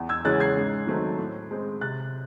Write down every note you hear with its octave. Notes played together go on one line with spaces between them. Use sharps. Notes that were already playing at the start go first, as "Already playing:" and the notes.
Already playing: E2
E6 G#6
C#3 E3 G#3 C#4 F#6 A6
G#6 C7
G#2
D#3 F#3 A3 C4
A2
G#3 C4
C3 F#6 A6